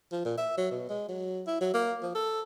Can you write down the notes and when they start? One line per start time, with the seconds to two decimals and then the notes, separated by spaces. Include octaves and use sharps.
0.12 F3
0.25 A#2
0.38 E5
0.58 F#3
0.71 B2
0.89 G#3
1.09 F#3
1.47 E4
1.61 F#3
1.74 A#3
2.02 F3
2.15 A4